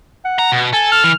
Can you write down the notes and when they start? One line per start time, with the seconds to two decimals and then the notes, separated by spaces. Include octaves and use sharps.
0.25 F#5
0.39 A#5
0.52 B2
0.73 A4 G#5
0.92 F6
1.04 E3